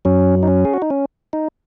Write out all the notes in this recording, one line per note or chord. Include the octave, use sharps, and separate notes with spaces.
F#2 F#3 C#4
D#4
C#4
G#4
F#4
D#4
C#4
D#4